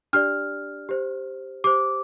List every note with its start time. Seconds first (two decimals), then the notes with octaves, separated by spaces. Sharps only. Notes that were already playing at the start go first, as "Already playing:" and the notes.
0.13 D4 G4 D5 F6
0.89 G4 C5
1.64 G4 C5 D6